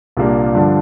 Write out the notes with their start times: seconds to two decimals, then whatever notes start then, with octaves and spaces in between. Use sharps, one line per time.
0.17 C2 A#2 G3 A#3 D4
0.55 G2 D3 F3 D4